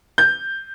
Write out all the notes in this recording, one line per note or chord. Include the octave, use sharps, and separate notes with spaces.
G6